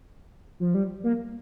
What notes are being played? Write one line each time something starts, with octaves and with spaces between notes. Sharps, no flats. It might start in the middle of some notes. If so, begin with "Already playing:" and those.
F3
G3
A#3